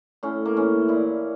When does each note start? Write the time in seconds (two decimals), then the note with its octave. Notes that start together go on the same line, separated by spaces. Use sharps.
0.23 A2 C#4
0.45 A#3
0.57 E3 C#4
0.88 A#2 E4